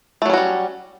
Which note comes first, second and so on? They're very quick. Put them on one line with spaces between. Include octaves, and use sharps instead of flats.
A3 F#3 C#4 F#4 G3